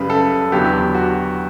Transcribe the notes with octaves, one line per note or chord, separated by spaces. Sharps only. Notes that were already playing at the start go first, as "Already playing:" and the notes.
Already playing: F#2 C#3 G3 B4
A4
E2 D3 F#3 B3 G4
F#4